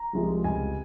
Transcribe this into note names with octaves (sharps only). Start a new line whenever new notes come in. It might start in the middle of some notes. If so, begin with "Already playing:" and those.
Already playing: A#5
C2 C3 F3 G#3
C#2 C3 G3 G#5